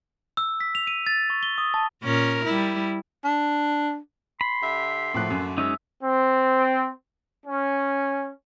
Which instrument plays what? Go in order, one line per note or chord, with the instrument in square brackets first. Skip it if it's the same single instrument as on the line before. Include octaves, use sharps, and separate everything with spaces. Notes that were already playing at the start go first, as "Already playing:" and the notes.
[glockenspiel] E6
B6
F7
D#7
A6
C#6
G7
D#6
A5
[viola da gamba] A#2 C#4 A#4
G3 E4
[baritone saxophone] D4
[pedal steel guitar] B5 [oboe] C6
[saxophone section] D3 G4 E5
[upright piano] A2 F3 F#6 [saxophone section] D3 A3 A#3
[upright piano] F#2
[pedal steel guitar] G#3 C#4 D#4 [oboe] E5
[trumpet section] C4
C#4